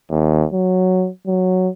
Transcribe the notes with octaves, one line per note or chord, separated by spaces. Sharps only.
D#2
F#3
F#3